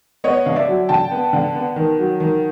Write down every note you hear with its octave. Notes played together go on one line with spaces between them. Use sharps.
B3 C#5 D#5
D3 F5
D5 E5
F#3
D3 G5 A5
B3
D3
B3
D#3
F#3
D#3